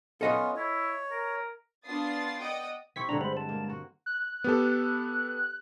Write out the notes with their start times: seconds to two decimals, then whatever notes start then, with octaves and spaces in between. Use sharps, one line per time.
0.21 B3 C#4 F4 A4 D#5 F#5
0.56 E4 C#5
1.11 A#4
1.85 B3 D4 F4 D#6 A6 C7
2.39 D5 D#5 F#5 G5 D#6
2.96 C4 E4 G4 C#6 G#6 B6
3.09 G2 D3 D4 F#5 A#5
3.21 G#3 C5 B5
3.37 A5
3.49 A#3
3.69 F#4
4.06 F#6
4.44 B3 G4 A4